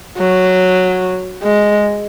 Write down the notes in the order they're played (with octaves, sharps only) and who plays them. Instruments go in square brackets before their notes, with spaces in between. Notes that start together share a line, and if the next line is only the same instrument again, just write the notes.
[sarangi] F#3
G#3